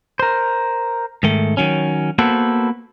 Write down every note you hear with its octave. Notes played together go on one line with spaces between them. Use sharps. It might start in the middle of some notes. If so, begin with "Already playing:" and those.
A#4 C5
G#2 D#3 A3
D#3 F#3 C#4
A#3 B3 F#4 A4 B4 C5